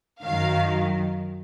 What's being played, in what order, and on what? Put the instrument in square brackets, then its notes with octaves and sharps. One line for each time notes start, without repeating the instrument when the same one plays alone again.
[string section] F#2 D#3 F#3 F5